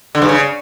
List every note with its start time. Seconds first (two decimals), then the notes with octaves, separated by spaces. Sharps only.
0.15 D3
0.22 G2
0.29 C#3